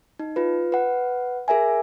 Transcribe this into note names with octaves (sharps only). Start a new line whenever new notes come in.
D#4
F4 B4
B4 F#5
G#4 A#4 E5 G#5